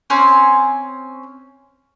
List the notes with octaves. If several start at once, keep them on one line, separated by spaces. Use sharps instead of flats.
C4 C#4 G#5